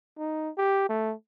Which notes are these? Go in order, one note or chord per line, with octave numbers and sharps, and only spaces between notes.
D#4
G4
A3